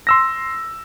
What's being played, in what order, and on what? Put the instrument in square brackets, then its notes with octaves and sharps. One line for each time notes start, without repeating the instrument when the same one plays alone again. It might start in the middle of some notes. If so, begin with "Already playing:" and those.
[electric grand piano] C6 E6 A#6